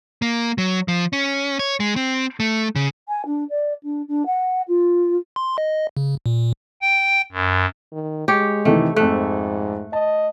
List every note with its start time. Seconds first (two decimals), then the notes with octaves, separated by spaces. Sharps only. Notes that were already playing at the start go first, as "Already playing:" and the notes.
0.22 A#3
0.58 F#3
0.88 F3
1.13 C#4
1.59 C#5
1.80 G#3
1.96 C4
2.40 A3
2.76 C#3
3.08 G#5
3.26 D4
3.49 D5
3.83 D4
4.08 D4
4.26 F#5
4.68 F4
5.36 C6
5.58 D#5
5.97 C#3
6.26 A#2
6.82 G5
7.32 F#2
7.92 D#3
8.28 G#3 G4 C#5
8.65 C3 D#3 E3 A3
8.96 F2 G#2 A3 A4 F#6
9.93 D#5 A5